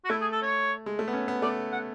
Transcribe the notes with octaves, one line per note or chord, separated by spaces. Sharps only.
F#4
A3 E4
G#4
A4
C#5
G#3
A3
B3
C#4
B3
A3 D5
F#5